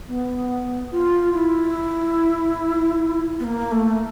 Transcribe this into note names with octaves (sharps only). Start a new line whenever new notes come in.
B3
F4
E4
B3
A#3
A3